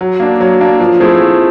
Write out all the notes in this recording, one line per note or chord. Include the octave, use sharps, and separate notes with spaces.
F#3
A#3 D4
F#3
A#3 D4
F3
A3 C4 E4 G#4
F3